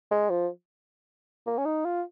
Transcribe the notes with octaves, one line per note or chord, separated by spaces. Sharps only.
G#3
F3
A#3
C#4
D#4
F4